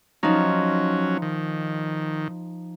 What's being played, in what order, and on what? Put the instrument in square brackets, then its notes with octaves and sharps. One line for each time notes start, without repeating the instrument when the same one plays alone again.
[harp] F3 D#4 [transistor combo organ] F#3 C#4
[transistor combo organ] D#3